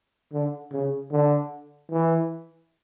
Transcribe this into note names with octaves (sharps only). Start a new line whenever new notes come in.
D3
C#3
D3
E3